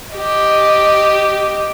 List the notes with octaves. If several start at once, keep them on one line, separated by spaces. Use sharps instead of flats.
G4 D#5